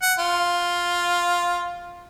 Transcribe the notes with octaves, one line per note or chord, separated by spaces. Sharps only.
F#5
F4